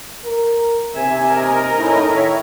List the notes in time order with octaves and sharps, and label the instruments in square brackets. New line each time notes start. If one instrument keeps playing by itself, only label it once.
[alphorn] A#4
[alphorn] C3 [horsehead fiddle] E5 [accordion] G#5
[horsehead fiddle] A#4 D#5
[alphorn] A2 [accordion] C#4 D#4 E4
[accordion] D#3 C#5 E5